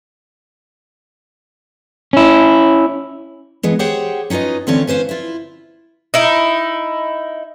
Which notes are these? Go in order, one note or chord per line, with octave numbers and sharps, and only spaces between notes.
C#4 E4
E3 G#3 B3
G4 G#4 C5 C#5 F#5 G5
C#4 D#4 F4 B4 D#5
D3 E3 C4 C#4 F4 C#5
C#4 B4 C5 F5
E4 F4
D#4 E4